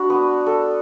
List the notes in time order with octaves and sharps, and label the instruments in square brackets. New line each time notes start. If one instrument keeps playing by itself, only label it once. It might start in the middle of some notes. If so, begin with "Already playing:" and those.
Already playing: [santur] D4 F#4 B4
B3
A4